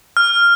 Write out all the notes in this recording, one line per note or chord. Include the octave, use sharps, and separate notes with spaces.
F6